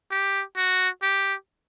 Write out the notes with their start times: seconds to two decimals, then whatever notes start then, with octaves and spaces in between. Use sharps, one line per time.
0.11 G4
0.57 F#4
1.03 G4